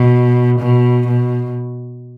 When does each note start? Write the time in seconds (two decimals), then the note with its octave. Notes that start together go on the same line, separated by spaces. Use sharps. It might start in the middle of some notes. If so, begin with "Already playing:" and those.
Already playing: B2
0.59 B2
1.07 B2